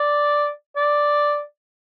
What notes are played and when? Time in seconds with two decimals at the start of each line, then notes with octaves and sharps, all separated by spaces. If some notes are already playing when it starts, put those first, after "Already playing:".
Already playing: D5
0.76 D5